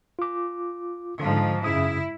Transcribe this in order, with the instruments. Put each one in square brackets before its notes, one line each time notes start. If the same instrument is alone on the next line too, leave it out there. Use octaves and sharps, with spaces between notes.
[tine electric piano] F4 D6
[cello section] G#2 F3 [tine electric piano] D3
[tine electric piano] F#2 C#3 D#6 [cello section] E4